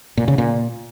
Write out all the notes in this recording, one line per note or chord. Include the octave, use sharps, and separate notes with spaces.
A#2
C#3
A#2